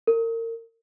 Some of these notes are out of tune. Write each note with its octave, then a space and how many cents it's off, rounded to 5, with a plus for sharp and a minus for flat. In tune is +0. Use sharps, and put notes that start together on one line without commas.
A#4 -35